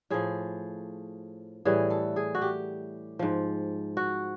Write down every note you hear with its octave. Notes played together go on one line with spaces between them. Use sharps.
A2 F3 G#4
A2 E3 G3 G#4
A4
G#4
F#4
G4
G#2 F3
F#4